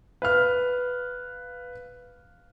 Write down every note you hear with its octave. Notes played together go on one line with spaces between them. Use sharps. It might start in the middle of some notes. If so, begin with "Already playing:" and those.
B4 F5 F6